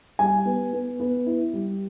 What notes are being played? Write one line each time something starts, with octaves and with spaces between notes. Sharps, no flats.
G3 G#5
B3
B3
B3
E4
G3